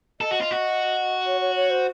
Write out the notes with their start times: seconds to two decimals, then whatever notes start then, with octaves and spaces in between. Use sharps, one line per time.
0.21 A4 D#5
0.31 F#4
0.41 F4
0.51 F#4
1.26 C#5
1.41 C#5
1.56 C#5
1.70 C5